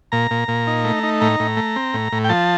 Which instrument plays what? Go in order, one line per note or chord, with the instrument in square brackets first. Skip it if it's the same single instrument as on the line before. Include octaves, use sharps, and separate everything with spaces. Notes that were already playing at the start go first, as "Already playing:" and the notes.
[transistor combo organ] A#2 A#5
A#2
A#2
D#4
A3
D#4
A2 A#5
A2
A3
C4
A2
A2
G5
F3 A5